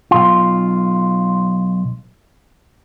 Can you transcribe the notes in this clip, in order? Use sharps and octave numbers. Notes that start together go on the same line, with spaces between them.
B1 F4